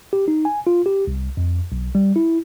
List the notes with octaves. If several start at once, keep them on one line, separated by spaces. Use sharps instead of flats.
G4
D#4
G#5
F4
G4
C2
F2
B1
G3
E4